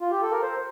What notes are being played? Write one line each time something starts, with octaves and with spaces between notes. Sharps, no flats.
F4
G4
A4
A#4
C5